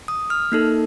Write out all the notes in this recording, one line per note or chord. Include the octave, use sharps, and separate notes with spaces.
D#6
F6
A#3 D#4 A4